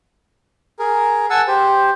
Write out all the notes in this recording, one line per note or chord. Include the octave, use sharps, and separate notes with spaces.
G#4 A#4
F#5 G#5 A5 E6
G4 C5